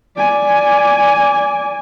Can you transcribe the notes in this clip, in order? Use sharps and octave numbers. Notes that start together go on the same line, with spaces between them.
D5 G#5